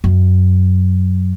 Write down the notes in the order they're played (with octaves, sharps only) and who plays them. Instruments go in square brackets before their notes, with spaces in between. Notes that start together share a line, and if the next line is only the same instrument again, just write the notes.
[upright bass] F#2